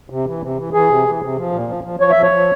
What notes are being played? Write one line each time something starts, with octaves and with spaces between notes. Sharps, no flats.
C3
E3
C3
E3
E3 G#4
C3
E3
C3
F3
A#2
F3
F3
F3 C#5
E5
F3
C#5
F3